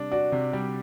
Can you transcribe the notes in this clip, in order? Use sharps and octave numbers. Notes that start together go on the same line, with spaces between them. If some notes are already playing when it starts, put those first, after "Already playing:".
Already playing: C3 G3 D4
F#4 D5
C3
G3